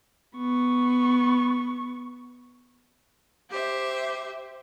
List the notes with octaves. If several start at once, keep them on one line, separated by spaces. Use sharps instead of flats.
B3 C#6
G4 C5 E5